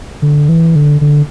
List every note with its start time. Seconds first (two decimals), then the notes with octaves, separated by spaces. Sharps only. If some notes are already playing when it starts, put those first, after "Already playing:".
0.22 D3
0.49 E3
0.76 D3
1.01 D3